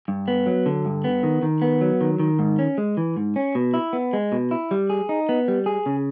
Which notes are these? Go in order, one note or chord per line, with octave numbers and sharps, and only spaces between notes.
G2
B3
F#3
D3
G2
B3
D#3
D#3
B3
F#3
D#3
D#3
G#2
C#4
G#3
E3
G#2
C#4
B2
E4
B3
G#3
B2
E4
G3
G#4
D#4
B3
G3
G#4
C#3